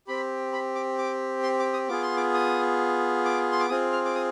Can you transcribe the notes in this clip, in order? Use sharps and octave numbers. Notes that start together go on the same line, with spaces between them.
C4 G4 B5
B5
D6
D6
C6
D6
D#6
B3 F4 G#4 D6
C6
D6
D#6
D6
C6
D6
C4 F4 G#4 D#6
F6
D6
D#6